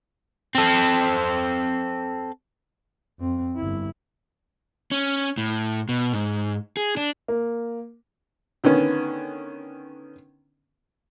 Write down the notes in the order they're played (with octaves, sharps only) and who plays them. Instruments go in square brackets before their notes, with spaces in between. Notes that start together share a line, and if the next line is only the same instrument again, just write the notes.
[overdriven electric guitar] C4 A4
[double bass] F2 C4
G1 E4
[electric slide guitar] C#4
A2
B2
G#2
G#4
D4
[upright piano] A#3
[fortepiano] D3 D#3 B3 C#4